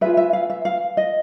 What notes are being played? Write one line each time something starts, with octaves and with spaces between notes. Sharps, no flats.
F4 G#4 B4 E5
E5
F5
E5
F5
D#5